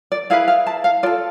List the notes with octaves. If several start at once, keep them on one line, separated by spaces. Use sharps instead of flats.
D5
E4 G#4 B4 F5
F5
A5
F5
F4 A4 D5